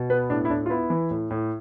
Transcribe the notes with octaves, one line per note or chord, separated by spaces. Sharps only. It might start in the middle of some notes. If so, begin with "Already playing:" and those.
Already playing: B2
B3 B4
A2 D4
E4
A2 D4
F4
B3 E4
E3
A2
A2